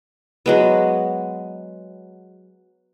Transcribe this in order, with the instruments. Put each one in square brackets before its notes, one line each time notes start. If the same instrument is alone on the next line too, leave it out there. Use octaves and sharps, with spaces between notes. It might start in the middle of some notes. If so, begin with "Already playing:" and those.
[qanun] F#3 G#3 B3